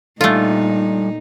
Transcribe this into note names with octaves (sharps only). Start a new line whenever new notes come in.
A#2 G3 A3 D4 D#4 F4 A4